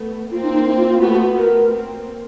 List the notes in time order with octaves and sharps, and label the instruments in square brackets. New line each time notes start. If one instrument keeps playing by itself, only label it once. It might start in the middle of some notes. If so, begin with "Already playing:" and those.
Already playing: [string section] A3 B3
[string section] A#3 C4 [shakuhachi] F4
[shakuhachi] D#4
D#4
E4
F4
F4
[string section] A3 B3 [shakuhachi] F#4
[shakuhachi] F#4
[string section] A3 B3 [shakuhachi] A#4
[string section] A#3 C4